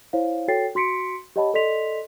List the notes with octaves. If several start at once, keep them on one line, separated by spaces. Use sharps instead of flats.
E4 C5 C#5 F5
F#4 A4 C#5 G5 A6 C7
F#4 C6 B6 C#7 D7
G4 C#5 D#5 F#5 A5 B5
A4 D5 D#5 C6 B6 F7